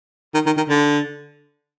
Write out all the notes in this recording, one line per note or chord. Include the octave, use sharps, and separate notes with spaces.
D#3
D#3
D#3
D3